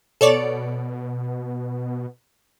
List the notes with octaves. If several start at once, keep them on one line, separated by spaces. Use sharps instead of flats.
B2 A4 C#5 D5